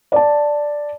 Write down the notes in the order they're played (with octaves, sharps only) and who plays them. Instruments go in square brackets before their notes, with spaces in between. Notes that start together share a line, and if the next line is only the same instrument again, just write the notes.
[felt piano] D5 A5